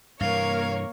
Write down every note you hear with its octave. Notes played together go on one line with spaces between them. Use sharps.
G2 C3 E3 A#3 A#4 C#5 F5